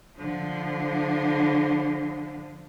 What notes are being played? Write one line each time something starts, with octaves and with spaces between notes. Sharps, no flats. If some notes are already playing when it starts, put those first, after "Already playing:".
D3 F3